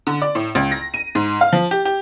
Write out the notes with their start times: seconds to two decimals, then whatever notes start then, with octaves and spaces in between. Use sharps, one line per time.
0.07 D3
0.22 D5
0.35 A2
0.55 C#2
0.71 A#6
0.94 D#7
1.15 G#2
1.41 F5
1.53 F3
1.71 G4
1.85 G4